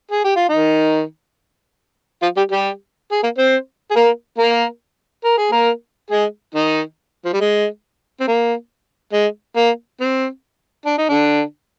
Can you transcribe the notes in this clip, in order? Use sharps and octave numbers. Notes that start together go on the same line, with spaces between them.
G#4
G4
F4
D#3 D#4
F3 F4
G3 G4
G3 G4
G#4
A#3 A#4
C4 C5
G#4
A#3 A#4
A#3 A#4
A#4
G#4
A#3 A#4
G#3 G#4
D#3 D#4
F3
G3
G#3
C4
A#3
G#3
A#3
C4
D4
D#4
D3 D4